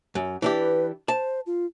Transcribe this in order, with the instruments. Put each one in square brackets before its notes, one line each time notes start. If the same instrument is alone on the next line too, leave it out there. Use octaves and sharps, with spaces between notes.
[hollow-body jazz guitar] F#2
[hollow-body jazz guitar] E3 D4 G4 [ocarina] B4
[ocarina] C5 [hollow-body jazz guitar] A5
[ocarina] F4